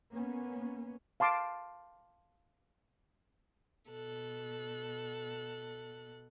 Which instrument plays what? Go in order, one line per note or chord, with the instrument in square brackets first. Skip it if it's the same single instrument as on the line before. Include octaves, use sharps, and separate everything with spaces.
[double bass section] A#3 B3 C#4
[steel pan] F5 A5 C6 D6
[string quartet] B2 A4 F#6